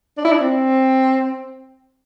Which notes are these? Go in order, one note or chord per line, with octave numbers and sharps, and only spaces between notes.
D4
E4
D4
C4